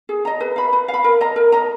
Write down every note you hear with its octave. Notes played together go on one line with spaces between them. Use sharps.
G#4
D#5 A#5
B4
F5 B5
B4
F5
B5
A#4
D#5 A#5
A#4
D#5 A#5